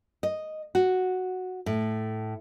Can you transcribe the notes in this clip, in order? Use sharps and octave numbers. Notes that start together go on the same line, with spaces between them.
D#5
F#4
A2